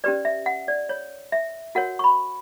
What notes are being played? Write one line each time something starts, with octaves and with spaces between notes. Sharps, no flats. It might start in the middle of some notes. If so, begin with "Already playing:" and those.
C#4 G4 B4 D5
E5
F#5
D5
C#5
E5
F#4 A#4 C#5 F#5
C#6
B5